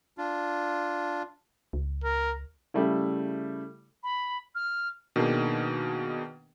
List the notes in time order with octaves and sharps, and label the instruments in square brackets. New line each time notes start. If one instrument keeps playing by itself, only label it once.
[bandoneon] D4 F4
[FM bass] C#2
[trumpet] A#4
[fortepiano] C#3 G3 A3 E4
[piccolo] B5
F6
[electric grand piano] B2 D#3 A#3 D4 D#4 G#4